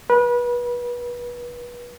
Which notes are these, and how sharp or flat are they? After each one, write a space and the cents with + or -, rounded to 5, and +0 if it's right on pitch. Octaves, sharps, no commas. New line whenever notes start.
B4 -30